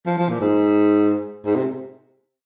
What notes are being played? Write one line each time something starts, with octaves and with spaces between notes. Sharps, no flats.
F3
F3
A#2
G#2
G#2
C3